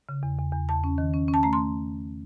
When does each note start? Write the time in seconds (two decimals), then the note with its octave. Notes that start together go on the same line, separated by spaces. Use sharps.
0.09 C#3
0.23 E2
0.39 E2
0.53 E2
0.69 E2 A5
0.84 C#4
0.98 D#3
1.14 C#4
1.28 C#4
1.34 A5
1.43 A3 A#5
1.53 C6